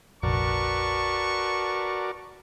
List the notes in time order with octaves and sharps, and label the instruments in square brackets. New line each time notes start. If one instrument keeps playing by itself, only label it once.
[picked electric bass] F1 A#1 [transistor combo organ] F#4 A#4 D5 [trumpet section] B4 A5 C#6